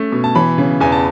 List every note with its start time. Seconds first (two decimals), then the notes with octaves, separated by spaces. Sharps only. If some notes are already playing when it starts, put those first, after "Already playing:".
Already playing: A3 C#4
0.12 B2
0.24 A5
0.35 E3 B5
0.58 C#3
0.80 E2 G#5
0.92 A5